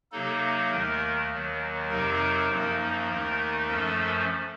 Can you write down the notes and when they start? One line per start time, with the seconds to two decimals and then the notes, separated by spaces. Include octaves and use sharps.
0.12 C3 F#3 A#3 D#4 A4
0.71 D#2 D#3 A3 A#4
1.30 D#2 D#3 F#3
1.89 F2 C3 F#3 C4 D#4 A#4
2.49 F#2 F3 A#3 D#4
3.09 D#2 D#3 A3 D#4 A#4
3.69 F#2 F3 A3 C#4 A4